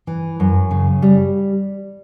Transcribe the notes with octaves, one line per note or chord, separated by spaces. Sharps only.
E3
F#2
C#3
G3